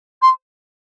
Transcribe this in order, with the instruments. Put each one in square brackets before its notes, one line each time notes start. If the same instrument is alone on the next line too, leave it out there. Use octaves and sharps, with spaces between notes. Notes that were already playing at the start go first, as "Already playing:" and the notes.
[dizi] C6